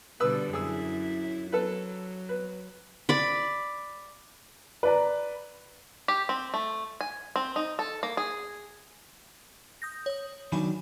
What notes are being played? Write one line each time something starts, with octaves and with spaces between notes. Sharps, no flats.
B2 D3 G3 B4 E6
F#2 E4 G#4 E6
F#3 A4 B4
B4
D5 B5
B4 D5 A#5
G4
C4
A3
G#5
C4
D#4
A4
A#3
G#4
D#6 G6 A#6
C#5 D#6
D#3 F#3 D4 G#5 B5